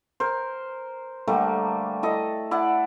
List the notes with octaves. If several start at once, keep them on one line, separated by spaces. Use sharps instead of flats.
A#4 C5
D3 G3 A3 A#3
E4 A4 D#5
E4 D5 F#5